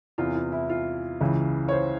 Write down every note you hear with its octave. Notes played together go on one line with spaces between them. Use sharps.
E2 C3 E3 F4
F4
E4
F4
C#2 C#3 E3
C#5
C5